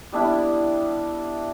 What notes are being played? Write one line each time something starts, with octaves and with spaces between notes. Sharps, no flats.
G3 B3 D4 E4